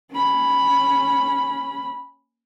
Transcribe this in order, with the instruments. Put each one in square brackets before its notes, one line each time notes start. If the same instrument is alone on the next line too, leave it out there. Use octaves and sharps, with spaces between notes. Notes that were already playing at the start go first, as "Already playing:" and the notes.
[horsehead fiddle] C#4 B5